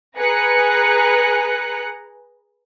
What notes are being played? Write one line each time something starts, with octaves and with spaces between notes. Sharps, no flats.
G#4 B4 A#5 F#6 C#7